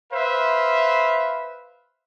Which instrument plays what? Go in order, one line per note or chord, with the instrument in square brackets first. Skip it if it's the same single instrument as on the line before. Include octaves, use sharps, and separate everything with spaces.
[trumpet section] B4 C5 E5 F5